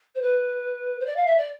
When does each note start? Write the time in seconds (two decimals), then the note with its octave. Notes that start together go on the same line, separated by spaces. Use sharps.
0.15 C5
0.21 B4
1.00 C5
1.06 D5
1.16 F5
1.26 E5
1.37 D5